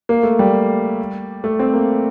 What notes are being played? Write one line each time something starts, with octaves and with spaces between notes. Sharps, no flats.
A#3
A3
G3
A3
C4
A#3